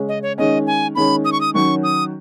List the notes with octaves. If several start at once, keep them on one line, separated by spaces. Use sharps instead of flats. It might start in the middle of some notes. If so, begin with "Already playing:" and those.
Already playing: C#3 G#3 C#4
D#5
C#5
D#3 G#3 C#4 D#5
G#5
D#3 G#3 C#4 B5
D#6
C#6
D#6
D#3 F#3 C#4 F#4 C#6
D#6